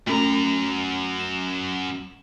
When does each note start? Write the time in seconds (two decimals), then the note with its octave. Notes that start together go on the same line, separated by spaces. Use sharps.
0.07 F#2 A3 C#4 A#5
1.19 E7